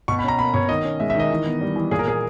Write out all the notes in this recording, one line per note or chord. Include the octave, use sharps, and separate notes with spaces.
B2 C#6
B5
C#4 A#5
A#3 B5
B2 C#5
D#3 D#5
C#4
G#3 E5
E5
D#3 D#5
E3
B3
G3
E3
A#2 G#4
A#4
A#3 G#4